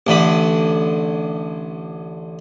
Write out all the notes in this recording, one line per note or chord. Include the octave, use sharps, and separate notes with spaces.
A1 D3 B5